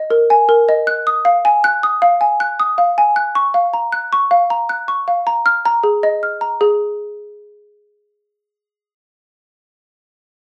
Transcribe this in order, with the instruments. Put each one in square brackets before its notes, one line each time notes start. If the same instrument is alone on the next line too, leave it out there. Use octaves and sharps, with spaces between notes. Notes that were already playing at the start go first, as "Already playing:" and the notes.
Already playing: [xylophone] D#5
A#4
G#5
A#4
D#5
F#6
D#6
F5
G#5
F#6
D#6
F5
G#5
F#6
D#6
F5
G#5
F#6
C#6
F5
A#5
F#6
C#6
F5
A#5
F#6
C#6
F5
A#5
F6
A#5
G#4
D#5
F6
A#5
G#4